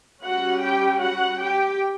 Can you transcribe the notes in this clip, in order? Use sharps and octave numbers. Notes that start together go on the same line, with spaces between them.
G3 C#4 F#4 F#5
G4 G5
F#4 F#5
G4 G5